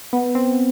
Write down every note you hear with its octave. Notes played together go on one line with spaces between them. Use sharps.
B3
C4